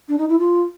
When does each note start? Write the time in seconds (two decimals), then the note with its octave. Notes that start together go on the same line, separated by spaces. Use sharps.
0.09 D4
0.18 D#4
0.29 E4
0.39 F4